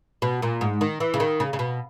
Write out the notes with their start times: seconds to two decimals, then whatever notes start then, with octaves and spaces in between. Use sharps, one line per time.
0.22 B2
0.42 A#2
0.61 G#2
0.81 D#3
1.00 E3
1.14 C#3
1.20 D#3
1.40 C#3
1.53 C#3
1.59 B2